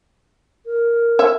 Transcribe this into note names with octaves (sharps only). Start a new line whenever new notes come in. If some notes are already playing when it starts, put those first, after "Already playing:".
A#4
C#5 E5